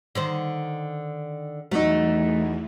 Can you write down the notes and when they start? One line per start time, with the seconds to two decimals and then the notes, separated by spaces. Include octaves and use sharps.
0.15 D3 D#3 C5
1.71 E2 E3 F#3 A3 D#4